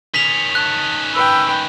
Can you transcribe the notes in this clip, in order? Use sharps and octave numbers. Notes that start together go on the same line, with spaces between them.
D#3 C#4 B6 F7
A5 F#6
B4 G5 E6